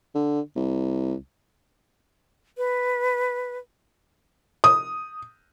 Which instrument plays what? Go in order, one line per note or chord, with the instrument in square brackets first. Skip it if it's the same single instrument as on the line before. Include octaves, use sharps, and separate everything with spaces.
[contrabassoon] D3
C2
[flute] B4
[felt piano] D#6